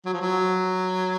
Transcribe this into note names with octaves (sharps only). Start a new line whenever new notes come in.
F#3
F3
F#3